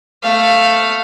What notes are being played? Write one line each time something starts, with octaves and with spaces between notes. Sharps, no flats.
A3 F5